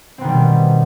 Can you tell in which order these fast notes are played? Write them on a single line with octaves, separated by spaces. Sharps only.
C4 B3 D#3 G3 B2